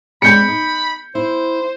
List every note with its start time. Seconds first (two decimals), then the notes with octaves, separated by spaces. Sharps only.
0.22 G#3 C4 D4 B5 G6 C#7
0.48 D#4
1.15 E4 C5